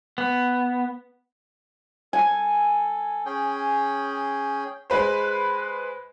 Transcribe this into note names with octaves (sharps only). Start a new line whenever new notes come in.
B3
A4 G#5
C#4 G#4 G5
G#3 B4 C5